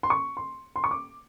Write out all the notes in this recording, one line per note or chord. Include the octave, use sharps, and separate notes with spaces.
C6
C#6
C6
C6
C#6
D6